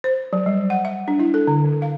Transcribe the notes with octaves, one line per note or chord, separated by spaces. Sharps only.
C5
F#3
G3
F#5
E5
D4
E4
A4
D3
D3
F5